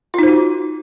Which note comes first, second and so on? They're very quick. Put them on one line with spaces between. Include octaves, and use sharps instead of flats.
F4 D#4 C5 F#4